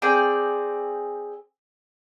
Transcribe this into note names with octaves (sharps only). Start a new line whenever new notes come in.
C4 G#4 D5 G5